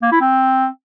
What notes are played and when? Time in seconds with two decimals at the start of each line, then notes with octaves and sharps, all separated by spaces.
0.02 A#3
0.12 E4
0.21 C4